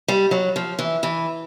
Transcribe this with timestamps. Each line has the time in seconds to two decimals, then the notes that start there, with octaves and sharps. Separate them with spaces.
0.08 G3
0.31 F#3
0.56 F3
0.79 E3
1.03 E3